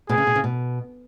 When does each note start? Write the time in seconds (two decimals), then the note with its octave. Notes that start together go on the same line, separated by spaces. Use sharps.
0.09 B2 G#4
0.18 C#3
0.27 B2
0.36 C#3
0.44 B2